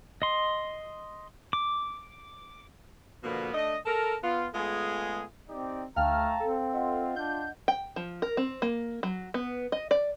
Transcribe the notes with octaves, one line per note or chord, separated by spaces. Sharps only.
D#5 C6
D6
B2 D3 F3 A#3 B3
A3 D4 D#5
A4 A#4
B3 F4
G#3 A3 B3 F4 G#4
C4 D#4 G4 D5
D2 A3 F5 G5 A5 A#5 F6
C4 A4
F4 D#5 F#5
D4 G6
G5
F3
A#4
C4
A#3
F#3
B3
D#5
D5